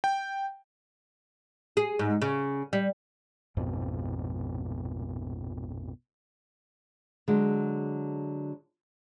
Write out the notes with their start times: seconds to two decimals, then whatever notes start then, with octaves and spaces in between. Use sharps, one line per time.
0.04 G5
1.77 G#4
1.99 G#2
2.22 C#3
2.73 G3
3.57 A#1 F2 G#2 B2
7.28 D3 F#3 G#3